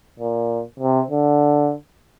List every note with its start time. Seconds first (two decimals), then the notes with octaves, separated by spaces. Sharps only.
0.19 A#2
0.80 C3
1.10 D3